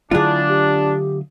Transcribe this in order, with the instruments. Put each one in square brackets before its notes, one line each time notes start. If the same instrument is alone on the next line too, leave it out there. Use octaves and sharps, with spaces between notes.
[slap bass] D3 F#3 A3 [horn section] D4 [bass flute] E4 [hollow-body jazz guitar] F4 G#4
[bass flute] G4